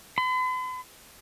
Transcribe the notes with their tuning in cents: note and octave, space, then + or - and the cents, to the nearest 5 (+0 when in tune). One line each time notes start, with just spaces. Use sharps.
B5 +45